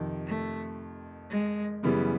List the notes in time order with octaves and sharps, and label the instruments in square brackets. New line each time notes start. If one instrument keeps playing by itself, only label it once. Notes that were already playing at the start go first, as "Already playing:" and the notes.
Already playing: [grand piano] F2 C3 D#3
[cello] A3
G#3
[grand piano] F#2 C#3 E3 G3 B3